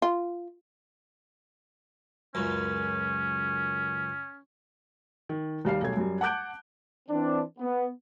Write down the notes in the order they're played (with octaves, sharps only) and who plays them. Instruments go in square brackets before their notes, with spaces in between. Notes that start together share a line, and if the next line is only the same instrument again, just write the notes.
[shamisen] F4
[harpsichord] C#2 F#2 [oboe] C#4
[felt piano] D#3
D#2 G3 F5 C7
B1 G3 A3 G#6
F#2 G3
F#5 A5 D6 F#6 G6 D7
[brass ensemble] E3 C4 D4
B3